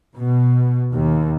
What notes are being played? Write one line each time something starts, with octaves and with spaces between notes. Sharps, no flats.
B2
D#2